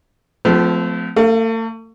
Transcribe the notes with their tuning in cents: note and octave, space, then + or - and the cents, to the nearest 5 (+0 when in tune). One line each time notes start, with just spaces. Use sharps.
F3 +15 A3 -15 C4 -45
A3 +40 F5 +0